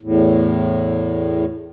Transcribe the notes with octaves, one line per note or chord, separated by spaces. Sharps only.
E2 A2